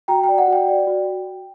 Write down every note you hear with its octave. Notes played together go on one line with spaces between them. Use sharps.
F#4 G5 A#5
G5
D5
F#5
F#4 G5
D5
F#4